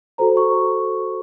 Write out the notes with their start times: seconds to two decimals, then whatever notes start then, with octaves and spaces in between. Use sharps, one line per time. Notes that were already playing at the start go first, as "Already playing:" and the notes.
0.18 F#4 A4 C5 A#5
0.37 C#6